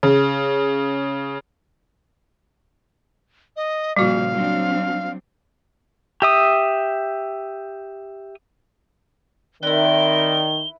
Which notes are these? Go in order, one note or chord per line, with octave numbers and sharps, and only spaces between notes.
C#3
D#5
A#2 C#3 F3 G3 F#4 F5
F#3 C4 D4
G4 E5 D#6
D#3 C4 E4 A#4 B4 D5 G7